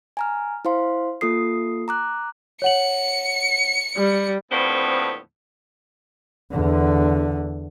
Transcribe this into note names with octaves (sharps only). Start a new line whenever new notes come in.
G#5 A#5 F6
E4 C5 F5 C6
A#3 F4 A4 D#6 C7
A#5 D6 F#6
C#5 F#5 C#7 F#7
G3
D#2 A2 D3 F3 B3 C4
E2 D3